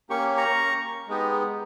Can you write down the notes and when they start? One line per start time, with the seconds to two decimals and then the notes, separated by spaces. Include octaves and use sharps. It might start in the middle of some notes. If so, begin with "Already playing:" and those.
0.09 A#3 C#4 G4 C#6
0.37 A#5 C#6
1.08 G#3 B3 D#4 G4